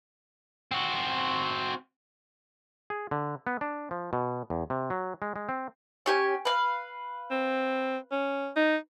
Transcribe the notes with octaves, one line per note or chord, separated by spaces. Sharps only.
C4 F#4
G#4
D3
B3
D4
F3
B2
E2
C3
F#3
G#3
G#3
C4
C#4 G4 G#5
B4 F5
C4
C#4
D#4